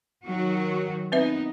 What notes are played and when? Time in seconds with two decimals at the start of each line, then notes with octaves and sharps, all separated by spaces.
0.23 D#3 F#3 F#4
1.12 B3 C4 D#4 B4 E5